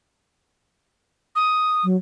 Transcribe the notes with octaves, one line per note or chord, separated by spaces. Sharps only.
D#6
F#3